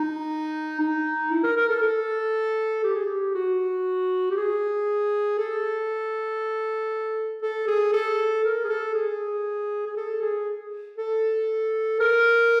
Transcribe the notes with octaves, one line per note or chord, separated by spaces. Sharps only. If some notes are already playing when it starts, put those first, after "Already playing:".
Already playing: D#4
D#4
E4
A#4
A#4
A4
A4
G4
G#4
G4
F#4
G4
G#4
A4
A4
G#4
A4
A#4
G#4
A4
G#4
G#4
A4
G#4
A4
A#4